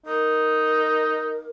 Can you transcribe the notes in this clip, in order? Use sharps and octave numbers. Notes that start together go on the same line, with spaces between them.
D#4 A#4